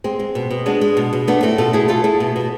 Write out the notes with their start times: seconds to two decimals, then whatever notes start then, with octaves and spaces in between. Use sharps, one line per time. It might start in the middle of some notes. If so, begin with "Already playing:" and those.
0.04 G#3 C4
0.19 G#3
0.35 B2
0.51 B2
0.66 G#3 B3 D4
0.81 G#3
0.97 B2
1.13 B2
1.28 A3 B3 D4
1.43 A3 C4 E4
1.58 B2 F4 A4
1.73 B2 E4 G#4
1.88 A3 F4 A4
2.04 A3 E4 G#4
2.20 B2
2.36 B2